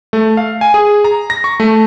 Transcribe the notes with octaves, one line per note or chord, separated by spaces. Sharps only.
A3
F5
G#5
G#4
A#5
A#6
C#6
A3